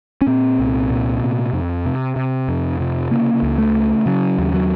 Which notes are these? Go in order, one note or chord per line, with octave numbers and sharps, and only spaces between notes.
C#4
A#2 C4
C2
A#2
C3
F2
C3
C3
F2
C3
C#3 A#3
C#2
A3
C#3
C#3 F#3
D#2
F#3